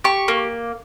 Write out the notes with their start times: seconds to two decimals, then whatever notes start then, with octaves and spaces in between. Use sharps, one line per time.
0.04 G4 C#6
0.28 A#3